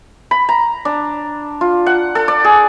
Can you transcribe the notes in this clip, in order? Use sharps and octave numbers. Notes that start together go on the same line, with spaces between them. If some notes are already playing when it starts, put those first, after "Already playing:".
B5
A#5
D4
F4
F#5
A4
D5
G#4